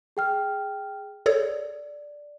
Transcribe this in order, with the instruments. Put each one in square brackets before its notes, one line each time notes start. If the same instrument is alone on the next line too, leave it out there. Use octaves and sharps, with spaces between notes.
[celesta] G#4 G5 F6
[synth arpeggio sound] G#4 A4 C#5 [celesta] D5